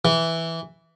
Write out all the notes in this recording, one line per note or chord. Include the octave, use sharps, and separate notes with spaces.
E3